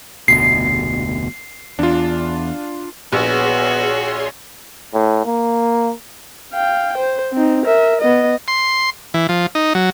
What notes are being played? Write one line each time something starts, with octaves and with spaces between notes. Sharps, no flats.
F1 D2 B2 C7
E2 D4 F4
A#1 B3 F#4 G#4 C#5 C6
A2
A#3
F5 G5
C5
C4 D#4
A#4 E5
B3 D#5
C6
E3
F3
D#4
F#3